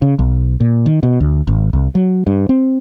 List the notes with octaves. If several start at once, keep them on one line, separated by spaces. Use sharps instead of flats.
C#3
B1
A#2
D#3
B2
D2
G#1
C2
F#3
G2
C4